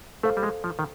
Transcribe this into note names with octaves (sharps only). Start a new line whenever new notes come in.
A3 A4 C5 F5
G3
G#3
F3
D#3